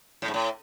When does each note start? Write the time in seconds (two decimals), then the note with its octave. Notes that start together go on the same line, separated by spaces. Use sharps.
0.22 A2
0.28 G#2
0.34 A2